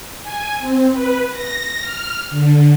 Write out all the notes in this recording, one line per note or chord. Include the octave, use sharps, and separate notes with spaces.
G#5
C4
B4
A#6
F6
D3